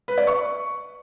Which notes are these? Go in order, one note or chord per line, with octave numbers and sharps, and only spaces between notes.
B4
D5
C#6